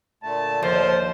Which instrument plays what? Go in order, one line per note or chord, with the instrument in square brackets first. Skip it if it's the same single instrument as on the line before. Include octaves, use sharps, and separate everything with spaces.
[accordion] A#2 D3 A3 [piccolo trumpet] A5
[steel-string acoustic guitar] D#2 [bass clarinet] F3 [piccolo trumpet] C5